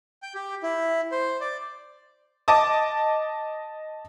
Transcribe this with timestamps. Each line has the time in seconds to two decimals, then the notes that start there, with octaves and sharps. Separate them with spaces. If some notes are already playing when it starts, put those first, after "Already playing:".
0.22 G5
0.35 G4
0.63 E4
1.12 C5
1.41 D5
2.48 D#5 A5 D6 D#6